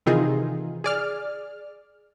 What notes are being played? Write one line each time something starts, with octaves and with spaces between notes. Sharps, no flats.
C3 D#3 E3 D#4 F4 G#4
G#4 D5 F6